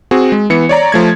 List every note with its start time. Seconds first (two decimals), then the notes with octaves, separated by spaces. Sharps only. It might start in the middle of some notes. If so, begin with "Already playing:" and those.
0.11 C4 F#4 G#4
0.32 G#3
0.50 E3 B3 C#7
0.69 C#5 D5 A#5
0.92 F3 A3 G#6